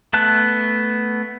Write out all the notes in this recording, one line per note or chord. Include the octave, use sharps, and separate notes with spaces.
A3 B3 A5 F#6